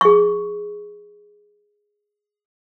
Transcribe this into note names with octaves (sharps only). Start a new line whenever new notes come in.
G#4 C#6